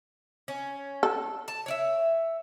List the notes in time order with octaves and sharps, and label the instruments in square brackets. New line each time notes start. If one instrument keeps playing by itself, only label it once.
[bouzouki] C#4
[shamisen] A4
[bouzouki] A5
C#5 D5 E5